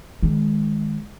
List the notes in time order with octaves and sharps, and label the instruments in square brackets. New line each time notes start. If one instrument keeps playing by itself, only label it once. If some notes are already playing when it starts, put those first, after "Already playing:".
[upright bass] D#3 G#3